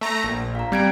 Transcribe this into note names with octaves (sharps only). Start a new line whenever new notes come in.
A3 A#5
A#1
F5 A#5
G3 C4 G#6 D7